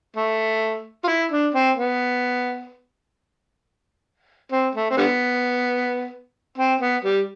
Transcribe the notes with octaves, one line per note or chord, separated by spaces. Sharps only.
A3
F4
E4
D4
C4
B3
C4
A3
C4
D3 G3 B3
C4
B3
G3